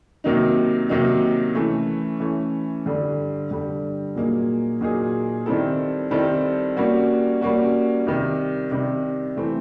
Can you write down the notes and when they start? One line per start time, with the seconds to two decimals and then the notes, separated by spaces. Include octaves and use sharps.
0.24 C3 D#3 F#3 A#3 D#4
0.89 C3 D#3 F#3 A#3 D#4
1.55 E3 A3 C#4
2.20 E3 A3 C#4
2.86 G2 D3 G3
3.51 G2 D3 G3
4.15 A#2 F#3 A#3 D#4 G#4
4.81 A#2 F#3 A#3 D#4 G#4
5.46 D#3 G3 C4 E4 A4
6.11 D#3 G3 C4 E4 A4
6.77 G3 A#3 C#4 F#4
7.41 G3 A#3 C#4 F#4
8.07 C3 D#3 G3
8.71 C3 D#3 G3
9.37 E3 A3 C4